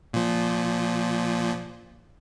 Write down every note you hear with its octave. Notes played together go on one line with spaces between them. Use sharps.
A#2 F3